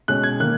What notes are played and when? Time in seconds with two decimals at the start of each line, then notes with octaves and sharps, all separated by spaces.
0.08 B2 G#3 C#4 F#6
0.23 G#6
0.40 D#3 A#3 F#6